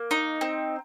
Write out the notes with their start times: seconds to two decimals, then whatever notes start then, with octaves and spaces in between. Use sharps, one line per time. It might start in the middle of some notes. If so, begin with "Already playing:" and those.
Already playing: A#3
0.11 D#4
0.41 C4